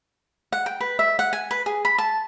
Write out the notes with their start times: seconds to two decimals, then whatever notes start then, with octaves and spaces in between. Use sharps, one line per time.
0.52 F#5
0.66 G5
0.80 B4
0.99 E5
1.19 F#5
1.33 G#5
1.51 B4
1.66 G#4
1.85 B5
1.98 A5